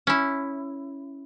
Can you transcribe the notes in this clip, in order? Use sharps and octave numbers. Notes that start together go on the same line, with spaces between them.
C#4 E4